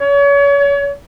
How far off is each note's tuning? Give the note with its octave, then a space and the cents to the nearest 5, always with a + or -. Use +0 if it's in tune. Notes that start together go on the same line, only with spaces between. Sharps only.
C#5 +35